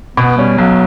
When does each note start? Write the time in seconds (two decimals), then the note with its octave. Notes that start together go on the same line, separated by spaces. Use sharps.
0.17 B2 B3
0.38 G3 C#4
0.58 B1 F#3